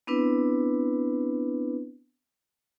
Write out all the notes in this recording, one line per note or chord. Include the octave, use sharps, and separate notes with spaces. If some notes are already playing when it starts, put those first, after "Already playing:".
B3 C4 D4 E4 B4